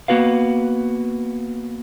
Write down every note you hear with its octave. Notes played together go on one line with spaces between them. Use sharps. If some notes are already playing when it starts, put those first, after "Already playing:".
A#3 B3 F#4 B4 F5